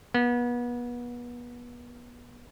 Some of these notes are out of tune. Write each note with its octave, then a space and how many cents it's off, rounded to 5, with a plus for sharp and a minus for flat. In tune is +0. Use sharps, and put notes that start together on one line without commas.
B3 -30